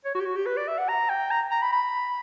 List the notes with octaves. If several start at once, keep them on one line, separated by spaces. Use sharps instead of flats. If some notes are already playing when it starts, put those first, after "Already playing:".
C#5
F#4
G4
F#4
G4
B4
D5
E5
F#5
A#5
G5
A#5
A#5
B5
B5